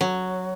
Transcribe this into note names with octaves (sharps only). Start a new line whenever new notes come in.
F#3